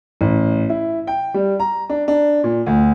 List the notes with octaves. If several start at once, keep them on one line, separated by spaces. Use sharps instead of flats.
A1
E4
G5
G3
A#5
D4
D4
A#2
D2